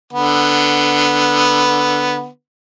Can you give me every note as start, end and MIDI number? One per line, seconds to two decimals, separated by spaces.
0.13 2.27 50
0.13 2.27 59